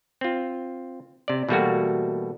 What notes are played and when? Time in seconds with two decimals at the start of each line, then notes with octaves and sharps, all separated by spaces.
0.21 C4 F4
1.28 C3 D5
1.49 B2 E3 G3 A3 A#3 F#4